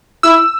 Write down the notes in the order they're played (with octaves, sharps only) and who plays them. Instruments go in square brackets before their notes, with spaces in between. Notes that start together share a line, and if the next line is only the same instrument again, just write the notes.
[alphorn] E4 [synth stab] E6